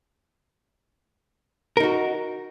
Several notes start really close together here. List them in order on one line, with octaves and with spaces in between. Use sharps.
A#4 D#4 F#4